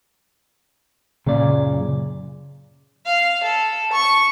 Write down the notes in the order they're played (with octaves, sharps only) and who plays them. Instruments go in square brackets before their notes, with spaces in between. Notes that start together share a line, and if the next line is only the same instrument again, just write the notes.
[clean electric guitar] F#2 A#2 D5 [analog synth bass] C#3
[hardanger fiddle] F5
A4
C#6